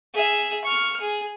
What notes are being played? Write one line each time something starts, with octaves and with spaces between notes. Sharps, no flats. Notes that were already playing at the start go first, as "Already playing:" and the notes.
G#4 E5
C#6 F6
G#4